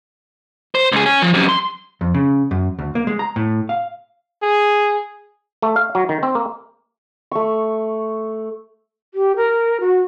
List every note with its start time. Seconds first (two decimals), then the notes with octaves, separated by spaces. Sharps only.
0.75 C5
0.92 C#2 G#4
1.06 C#5 G#5
1.22 F3
1.34 F#2 C3
1.49 C6
2.01 F2
2.14 C#3
2.51 F#2
2.79 D2
2.95 A#3
3.07 G#3
3.19 A#5
3.36 A2
3.69 F5
4.43 G#4
5.62 A3
5.76 F5
5.95 F#3
6.09 D#3
6.23 C4
6.35 A#3
7.32 A3 C#6
9.14 G4
9.36 A#4
9.80 F#4